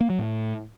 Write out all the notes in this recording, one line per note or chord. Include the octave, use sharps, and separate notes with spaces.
A#3
F#3
A2